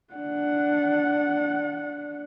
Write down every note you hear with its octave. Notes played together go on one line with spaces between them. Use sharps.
D4 F#5